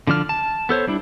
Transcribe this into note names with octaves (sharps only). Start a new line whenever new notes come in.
D3 F3 D4 F6
A5
B3 A4 C5 C#5
G3 D4 E4